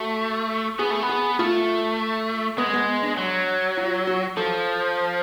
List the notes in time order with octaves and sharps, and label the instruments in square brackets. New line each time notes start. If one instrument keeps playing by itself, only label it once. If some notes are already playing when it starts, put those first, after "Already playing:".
Already playing: [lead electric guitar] A3 [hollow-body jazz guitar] F#4
[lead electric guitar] B3 [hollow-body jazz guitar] G#4
[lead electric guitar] A3
B3
[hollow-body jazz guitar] G#4
[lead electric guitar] A3 [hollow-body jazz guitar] F4
[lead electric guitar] G#3 [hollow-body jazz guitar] B3
[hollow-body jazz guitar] B3
D4
[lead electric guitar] F#3
[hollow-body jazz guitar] F4
F#4
[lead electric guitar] F3 [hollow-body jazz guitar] A4